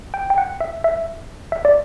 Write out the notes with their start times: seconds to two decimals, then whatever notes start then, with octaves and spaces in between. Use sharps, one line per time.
0.14 G5
0.30 G5
0.38 F#5
0.60 E5
0.84 E5
1.52 E5
1.65 D5